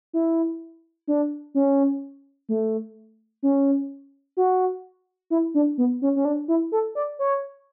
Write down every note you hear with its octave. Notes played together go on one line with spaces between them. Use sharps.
E4
D4
C#4
A3
C#4
F#4
E4
D4
B3
C#4
C#4
D4
E4
A4
D5
C#5